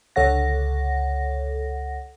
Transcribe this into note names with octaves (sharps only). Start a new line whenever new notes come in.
C#2 D3 A4 C#5 F#5 A#6